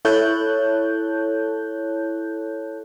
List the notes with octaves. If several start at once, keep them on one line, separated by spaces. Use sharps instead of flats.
E4 A4 C#5 A5 F#6 G6